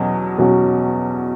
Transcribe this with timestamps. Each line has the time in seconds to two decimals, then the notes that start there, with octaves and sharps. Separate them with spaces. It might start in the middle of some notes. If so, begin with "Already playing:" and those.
Already playing: E2 B2 F#3 C#4 F#4
0.38 E2 B2 F#3 C#4 F#4